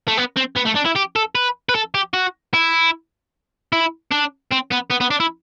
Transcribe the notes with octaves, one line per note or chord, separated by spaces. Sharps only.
A3
B3
C4
B3
A3
D4
E4
G4
A4
B4
B4
A4
G4
F#4
E4
E4
D4
C4
B3
B3
B3
D4
E4